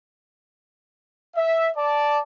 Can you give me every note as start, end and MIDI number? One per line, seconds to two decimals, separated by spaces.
1.36 1.69 76
1.76 2.19 74
1.76 2.19 81